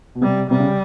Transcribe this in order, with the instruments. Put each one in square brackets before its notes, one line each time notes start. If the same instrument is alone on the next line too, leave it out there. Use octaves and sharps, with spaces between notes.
[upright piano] B2
[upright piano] C3 [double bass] G3
[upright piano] C3 [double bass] G3
[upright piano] C#3